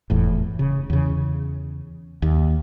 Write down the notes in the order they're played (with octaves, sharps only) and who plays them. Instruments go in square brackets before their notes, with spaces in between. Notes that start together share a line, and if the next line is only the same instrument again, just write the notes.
[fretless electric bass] F1 E2 A2
C#3
E2 C#3
D#2